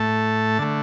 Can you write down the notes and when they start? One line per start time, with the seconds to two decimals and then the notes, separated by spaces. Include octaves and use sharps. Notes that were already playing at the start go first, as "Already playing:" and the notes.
Already playing: A2 A3 A5
0.58 D3 A3